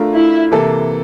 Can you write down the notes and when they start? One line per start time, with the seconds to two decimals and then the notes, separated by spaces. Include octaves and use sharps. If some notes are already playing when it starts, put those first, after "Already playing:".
Already playing: A3 D4 F4 A#4
0.15 E4
0.51 C3 E3 A#3 E4 A4